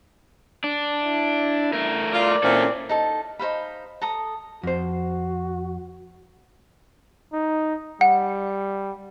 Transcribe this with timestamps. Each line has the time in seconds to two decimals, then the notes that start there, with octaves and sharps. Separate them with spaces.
0.64 D4
1.03 E4
1.73 A3 A#4
2.13 F4 D5
2.43 A#2 C4 C#4 E4 A4
2.89 D#4 A4 A5
3.39 D#4 C5 F5 B5
4.02 A4 A#5 D#6
4.63 F2 F#4 C5
7.33 D#4
8.01 G3 F#5